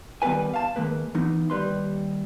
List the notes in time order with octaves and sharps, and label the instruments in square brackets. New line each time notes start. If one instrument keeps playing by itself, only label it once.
[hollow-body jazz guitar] D#3 G3 B3 A4 B4 G#5
F5 A5
D#3 G#3 A#3 B4
E3 B3 D#4
D#2 G3 B4 C6